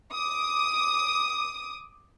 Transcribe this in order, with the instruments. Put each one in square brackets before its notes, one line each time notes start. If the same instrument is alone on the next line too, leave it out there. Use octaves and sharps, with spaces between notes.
[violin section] D6 D#6